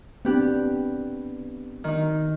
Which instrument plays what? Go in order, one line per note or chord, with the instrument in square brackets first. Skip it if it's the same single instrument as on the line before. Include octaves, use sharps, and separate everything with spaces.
[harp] B3 G4 F#6 [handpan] C4 D4
[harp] D#3 D#4